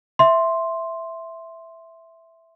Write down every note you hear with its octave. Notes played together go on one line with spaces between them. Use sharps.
E5 C6